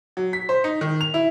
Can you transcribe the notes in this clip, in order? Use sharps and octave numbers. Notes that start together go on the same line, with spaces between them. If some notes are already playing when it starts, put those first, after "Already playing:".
F#3
B6
C5
D#4
D#3
F7
E4